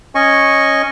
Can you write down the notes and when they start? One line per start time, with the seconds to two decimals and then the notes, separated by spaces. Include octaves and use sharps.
0.15 C#4 D#5 G#5 C#6